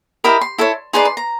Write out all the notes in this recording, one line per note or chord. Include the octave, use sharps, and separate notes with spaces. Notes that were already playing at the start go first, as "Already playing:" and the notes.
E4 G4 A#4 D#5 B5
C6
E4 A4 C#5
D#4 G#4 B4 D5 C6
C6
A#5